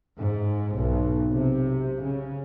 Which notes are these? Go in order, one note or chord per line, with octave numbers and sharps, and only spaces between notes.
G#2
B1
C3
C#3